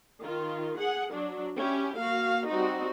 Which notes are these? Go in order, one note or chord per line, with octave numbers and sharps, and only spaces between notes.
D#3 F4
G#4 F#5
F#3 D4
C#4 E4 G4
A#3 F#4 F5
G3 C4 D#4 F#4